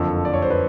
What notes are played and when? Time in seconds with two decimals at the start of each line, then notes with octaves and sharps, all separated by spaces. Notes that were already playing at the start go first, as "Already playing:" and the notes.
Already playing: F#1 F2 D3 F3 A4
0.25 D5
0.34 C#5
0.42 C5
0.50 B4